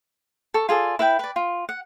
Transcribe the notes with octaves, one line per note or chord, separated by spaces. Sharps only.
A4 C#6
F4 G#4 A4 D5
E4 B4 E5 G5
B4 D5
F4
F#5